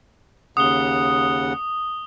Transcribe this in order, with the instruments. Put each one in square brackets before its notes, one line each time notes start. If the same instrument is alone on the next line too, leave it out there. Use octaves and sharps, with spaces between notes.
[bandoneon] D#2 C#3 F#5 [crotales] D#6 G7